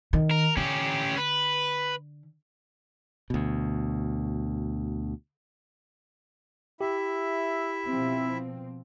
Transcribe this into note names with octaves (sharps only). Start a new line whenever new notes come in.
D#3
A#4
D3 C#4 G4
B4
D2 B2
E4 G4 E5
B2 F3 C4